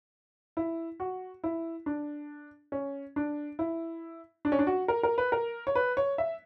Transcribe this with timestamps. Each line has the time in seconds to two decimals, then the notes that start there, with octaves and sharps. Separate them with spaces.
0.57 E4
1.00 F#4
1.44 E4
1.86 D4
2.72 C#4
3.16 D4
3.59 E4
4.45 D4
4.52 C#4
4.59 D4
4.67 F#4
4.88 A#4
5.03 A#4
5.18 B4
5.32 A#4
5.67 C#5
5.75 B4
5.97 C#5
6.18 E5